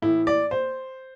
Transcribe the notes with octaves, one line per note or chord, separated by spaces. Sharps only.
A2 E3 E4
D5
C5